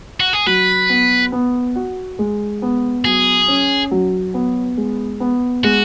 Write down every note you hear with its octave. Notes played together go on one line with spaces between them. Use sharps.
F#4
G#4
F#3 B4
B3
B3
F#4
G#3
B3
F#3 G#4
C#4
F#3
B3
G#3
B3
G#3 F#4